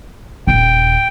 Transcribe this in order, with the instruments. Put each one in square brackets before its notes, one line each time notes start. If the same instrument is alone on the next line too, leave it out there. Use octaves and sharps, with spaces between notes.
[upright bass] D#1 [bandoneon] G5